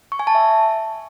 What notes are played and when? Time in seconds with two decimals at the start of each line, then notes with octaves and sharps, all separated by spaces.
0.12 C#6
0.19 G#5
0.27 A5
0.35 E5